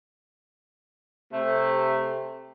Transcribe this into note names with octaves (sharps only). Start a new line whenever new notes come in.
C3 A3